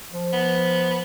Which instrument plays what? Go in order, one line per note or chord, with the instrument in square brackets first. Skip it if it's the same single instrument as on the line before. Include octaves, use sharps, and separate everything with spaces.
[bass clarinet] F3
[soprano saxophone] B3